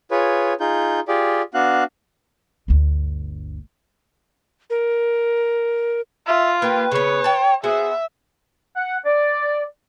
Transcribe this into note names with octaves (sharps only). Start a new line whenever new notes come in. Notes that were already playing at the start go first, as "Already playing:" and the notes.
F4 G#4 B4 C#5
D#4 F4 G#4 G6
F4 G4 G#4 D5
B3 D4 F#4 F5 F#6
G1 D2
A#4
F4 E5
A#3 G4 B4
C#3 B3 C#5
G5 A5
B3 F#4 G#4 C5 E5
F#5
D5